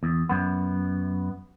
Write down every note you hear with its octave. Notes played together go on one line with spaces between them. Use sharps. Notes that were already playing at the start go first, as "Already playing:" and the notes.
E2
F#2 B3